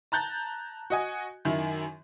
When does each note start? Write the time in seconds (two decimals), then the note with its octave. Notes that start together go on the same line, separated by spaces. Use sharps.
0.12 A5 A#5 F#6 G6 A6
0.90 F#4 D#5 G#5
1.45 F#2 D#3 E4